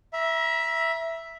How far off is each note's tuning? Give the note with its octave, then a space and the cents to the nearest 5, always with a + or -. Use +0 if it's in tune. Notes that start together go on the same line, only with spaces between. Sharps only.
E5 +0 A#5 +40